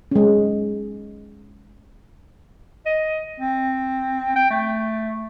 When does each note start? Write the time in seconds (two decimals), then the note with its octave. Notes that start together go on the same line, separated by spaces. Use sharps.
0.11 G#3 C#4
2.86 D#5
3.40 C4
4.36 G5
4.50 A3